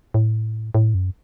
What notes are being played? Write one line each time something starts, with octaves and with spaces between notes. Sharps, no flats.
A2
A2
F#2